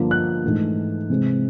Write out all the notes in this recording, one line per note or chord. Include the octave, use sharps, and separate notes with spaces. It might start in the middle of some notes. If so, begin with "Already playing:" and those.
Already playing: G2 D3 F3 A#3 D4
F#6
G#2 E3 A3 D4
C3 E3 G#3 C4